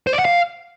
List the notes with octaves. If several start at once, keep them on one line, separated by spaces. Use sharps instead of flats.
C5
D5
F#5
F5